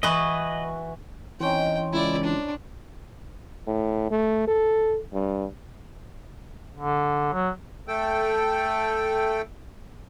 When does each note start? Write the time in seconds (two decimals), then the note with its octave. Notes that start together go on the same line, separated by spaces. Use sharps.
0.03 E3 E4 F#4 B4 D#5
1.40 E3 C4 C#4 D#4 G5
1.93 C#2 E4 D5
2.24 D4
3.67 A2
4.11 A3
4.47 A4
5.13 G2
6.77 D3
7.33 F#3
7.88 A3 A4 G5